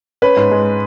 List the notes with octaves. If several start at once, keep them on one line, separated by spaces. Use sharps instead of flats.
C#4 B4
G#2
G#3